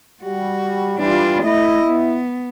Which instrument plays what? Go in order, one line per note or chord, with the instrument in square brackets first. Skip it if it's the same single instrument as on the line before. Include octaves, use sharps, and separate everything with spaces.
[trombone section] G3 [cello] F#4
[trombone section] E3 G3 [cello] D4 F4
[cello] A3 D#5 [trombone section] E4
[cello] B3